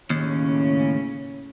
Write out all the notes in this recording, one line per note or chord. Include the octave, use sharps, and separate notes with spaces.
D#2 A2 C#3 C#4